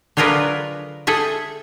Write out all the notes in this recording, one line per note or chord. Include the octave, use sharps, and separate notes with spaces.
D3 F#3 F4 G#4 A#4 B4
G#4 A4 E5